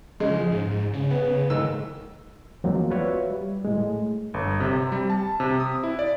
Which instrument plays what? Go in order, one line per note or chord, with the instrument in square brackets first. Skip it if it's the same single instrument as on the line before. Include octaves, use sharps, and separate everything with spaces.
[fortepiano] C#3 G#3 [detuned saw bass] F3
[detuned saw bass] G#2
C#3
[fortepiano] B3
G#2 D#3 E6
[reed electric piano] E2 F3 F#3 G#3 A#3 C4
F4 F#4 B4 C#5 D5 E5
G3
A2 G#3
[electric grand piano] G1
C3
G3
A5
C3
D#6
E4
D5